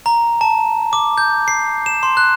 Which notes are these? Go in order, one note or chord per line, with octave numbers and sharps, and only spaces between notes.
A#5
A5
D6
G6
C7
E7
C6
F#6